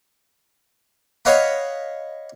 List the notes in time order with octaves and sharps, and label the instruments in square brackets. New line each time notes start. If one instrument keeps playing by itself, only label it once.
[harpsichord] C#5 D#5 F5 F#5 B5